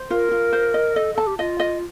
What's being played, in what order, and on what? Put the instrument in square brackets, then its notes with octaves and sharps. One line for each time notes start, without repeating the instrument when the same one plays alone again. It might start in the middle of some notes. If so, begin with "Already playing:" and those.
Already playing: [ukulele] C5
[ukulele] F4 [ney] A#4
[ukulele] F4
C5
D#5
[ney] A4 [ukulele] D#5
[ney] A4 [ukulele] A5
[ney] G4
[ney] F4 [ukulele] D#5
[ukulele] D#5